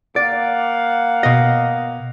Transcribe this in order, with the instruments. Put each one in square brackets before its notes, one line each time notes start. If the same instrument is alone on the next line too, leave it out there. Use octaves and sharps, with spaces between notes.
[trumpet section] A#3 F5 F#5 [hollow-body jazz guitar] D5
[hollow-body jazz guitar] B2 D#5